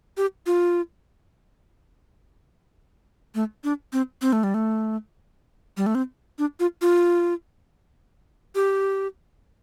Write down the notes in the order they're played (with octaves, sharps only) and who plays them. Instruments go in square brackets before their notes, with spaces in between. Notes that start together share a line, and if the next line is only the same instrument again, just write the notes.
[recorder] G4
F4
A3
D4
C4
C4
A3
G3
A3
G3
A3
C4
D4
F4
F4
G4